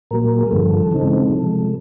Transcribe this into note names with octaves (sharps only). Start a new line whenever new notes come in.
A#2 F#3 A#3 A#4
G#4
G2 D3 F3 A4
C#3 E3 G#3 C4 D#4
C3 F3 G#3